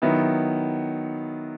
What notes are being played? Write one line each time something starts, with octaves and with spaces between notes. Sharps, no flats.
D#3 F#3 B3 E4